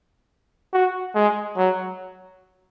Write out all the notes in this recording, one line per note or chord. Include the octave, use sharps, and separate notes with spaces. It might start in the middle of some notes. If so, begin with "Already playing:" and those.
F#4
G#3
F#3